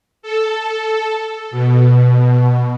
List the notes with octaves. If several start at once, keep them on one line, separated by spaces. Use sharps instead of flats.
A4
B2